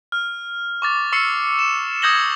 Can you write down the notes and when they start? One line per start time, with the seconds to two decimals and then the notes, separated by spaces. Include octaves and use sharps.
0.12 F6
0.82 C#6 D6 A6
1.12 C#6 E6 C7 C#7
1.59 E7
2.02 D#6 G6 G#6 A#6 F#7 G7